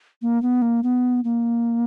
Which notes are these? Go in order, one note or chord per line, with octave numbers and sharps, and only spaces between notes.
A#3
B3
A#3
B3
A#3